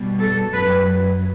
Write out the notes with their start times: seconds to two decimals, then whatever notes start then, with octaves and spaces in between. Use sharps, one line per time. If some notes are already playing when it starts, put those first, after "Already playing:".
Already playing: B2 G3
0.18 A4
0.53 F#2 F#3 B4